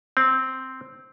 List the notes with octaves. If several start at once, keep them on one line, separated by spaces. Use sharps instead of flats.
C4